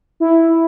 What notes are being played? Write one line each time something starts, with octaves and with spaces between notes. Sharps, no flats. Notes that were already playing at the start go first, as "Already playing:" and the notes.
E4